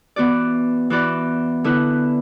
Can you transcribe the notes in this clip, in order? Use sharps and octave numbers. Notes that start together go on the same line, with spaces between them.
E3 B3 F#4 D5
E3 B3 F#4 D5
D3 B3 E4 B4